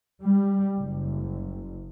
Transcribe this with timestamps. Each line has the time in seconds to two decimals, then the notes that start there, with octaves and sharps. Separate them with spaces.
0.24 G3
0.79 F#1